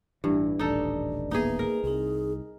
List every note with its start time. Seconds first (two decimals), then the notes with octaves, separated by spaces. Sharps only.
0.24 A1 G2 E3
0.59 D#1 A1 D4 D#4 A4 D5
1.31 A#3 B3 D#4 G#4 B4 E5
1.59 G#4 A#4 B4
1.84 C2 C4 D#4 G#4